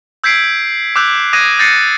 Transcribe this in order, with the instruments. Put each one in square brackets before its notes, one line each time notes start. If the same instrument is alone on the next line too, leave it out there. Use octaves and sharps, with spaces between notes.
[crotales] E6 G6 G#6 B6 C7 D7
D6 E6 F#6 G6 F7
D6 D#6 F#6 G#6 A#6 D#7
G6 A6 A#6 C7 C#7 D#7